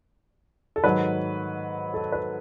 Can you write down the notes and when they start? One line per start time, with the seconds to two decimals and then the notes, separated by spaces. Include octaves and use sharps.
0.76 A4
0.84 G#2 D#3 F#3 B4
1.94 A4
2.12 B4